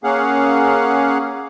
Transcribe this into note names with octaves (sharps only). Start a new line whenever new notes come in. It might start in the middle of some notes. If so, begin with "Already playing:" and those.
A#3 C#4 G#4 F5 F#5